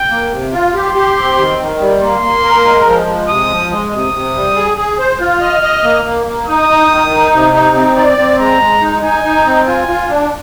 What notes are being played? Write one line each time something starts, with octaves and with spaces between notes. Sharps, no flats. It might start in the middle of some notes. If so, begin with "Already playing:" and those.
Already playing: G5
A#3
C3
F4
G4 C6
G4
C4
D#3
D#3
G3
A#3 C6
A#3
A#4
G#3
F3
G#3
C3 D#6
F3
G#3
C3 D#6
C3
G3
G#4
G#4
C5
F4 F6
D#5
D#5
A#3
A#3
A#3
D#4 D#6
D#4
D#3
D#4
C3
D#4
C4
D5
C4
G#3 A#5
G#3
D#4
D#4 G#5
D#4
C4
F4 G#5
F4
D4